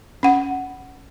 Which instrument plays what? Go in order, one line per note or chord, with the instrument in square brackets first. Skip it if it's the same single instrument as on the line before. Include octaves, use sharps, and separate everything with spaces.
[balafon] C#4 F#5